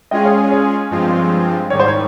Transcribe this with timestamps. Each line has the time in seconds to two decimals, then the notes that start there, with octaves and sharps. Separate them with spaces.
0.11 G#3 C#4 F4 G#4 D#5 G5
0.24 C#5 F5
0.38 C#5
0.51 C#5
0.91 G2 F3 G#3 C4 F4
1.70 G#2 D#3 G3 C#5
1.80 C5
1.88 C#5